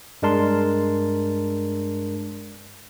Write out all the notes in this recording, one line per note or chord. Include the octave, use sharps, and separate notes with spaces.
G2 G#3 D4 A#4 A5 C6